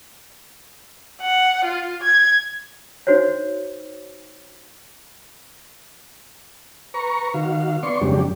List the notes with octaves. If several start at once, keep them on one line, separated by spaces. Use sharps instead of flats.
F#5
F4
G#6
D#4 F#4 C5 C#5
B4 A#5 C#6
D#3 F#4 F5
B3 D5 C6 C#6
F2 G#2 C#3 F#3 D4 G4